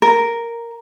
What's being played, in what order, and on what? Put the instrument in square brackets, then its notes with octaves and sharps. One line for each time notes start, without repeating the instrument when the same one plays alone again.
[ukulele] A#4